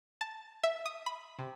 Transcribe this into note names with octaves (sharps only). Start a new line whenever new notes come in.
A5
E5
D#6
B5
C3